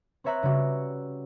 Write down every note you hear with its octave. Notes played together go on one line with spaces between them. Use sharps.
C4 B4 C#5 E5 A#5 F#6
C#3 G3 F#4